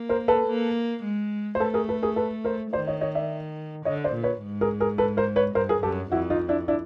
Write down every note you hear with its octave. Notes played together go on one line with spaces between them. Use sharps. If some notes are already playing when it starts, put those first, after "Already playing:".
Already playing: A#3
A#4 C5
A4 B4
A#3
G#3
C5
A3 A4 B4
G#4 A#4
A4 B4
G#4 A#4
A4 B4
A#4 C5
D#3 C5 D5
C#5 D#5
C#5 D#5
D5 E5
D3 C#5 D#5
C5 D5
A#2
B4 C#5
G#2
G#4 A#4
G#4 A#4
A4 B4
A#4 C5
B4 C#5
G2 A#4 C5
G#4 A#4
F#2 G4 A4
F2 E4 F#4
D#4 F4
D4 E4
D4 E4